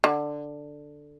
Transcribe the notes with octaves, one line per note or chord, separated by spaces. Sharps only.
D3